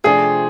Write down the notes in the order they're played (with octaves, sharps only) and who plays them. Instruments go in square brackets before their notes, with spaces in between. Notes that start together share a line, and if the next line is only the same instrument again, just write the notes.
[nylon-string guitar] F2 C3 F3 A3 D4 [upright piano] G#4